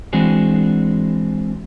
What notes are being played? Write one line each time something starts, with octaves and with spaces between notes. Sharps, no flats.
E3 G#3 C4 D4 F#4 G#4